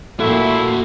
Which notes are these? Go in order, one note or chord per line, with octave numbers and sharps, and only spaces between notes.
A#2 A3 E4 F#4 E5